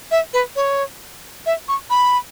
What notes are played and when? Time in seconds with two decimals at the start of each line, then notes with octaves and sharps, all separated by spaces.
0.11 E5
0.33 B4
0.56 C#5
1.46 E5
1.68 C#6
1.90 B5